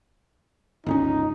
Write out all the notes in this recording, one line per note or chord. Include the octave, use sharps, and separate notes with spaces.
G1 C#2 C#4 D#4